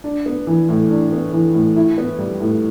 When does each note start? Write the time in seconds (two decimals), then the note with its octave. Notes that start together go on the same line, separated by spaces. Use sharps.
0.04 D4
0.26 B3
0.47 E3
0.69 A2
0.90 D4
1.12 B3
1.33 E3
1.54 A2
1.76 E4
1.98 B3
2.19 G3
2.40 A2